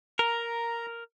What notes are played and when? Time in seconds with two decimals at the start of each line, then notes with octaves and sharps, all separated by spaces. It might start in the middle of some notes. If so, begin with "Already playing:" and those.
0.19 A#4 A#5